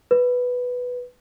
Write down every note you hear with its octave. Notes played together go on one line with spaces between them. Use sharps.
B4